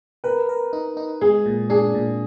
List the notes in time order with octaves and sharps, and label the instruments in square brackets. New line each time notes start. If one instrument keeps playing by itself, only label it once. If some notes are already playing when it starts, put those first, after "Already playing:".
[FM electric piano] A#4 [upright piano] B4
[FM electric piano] A#4
D#4
D#4
[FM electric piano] G#3 [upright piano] G#4
[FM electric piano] A#2
[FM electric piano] D4 [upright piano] G#4
[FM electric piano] A#2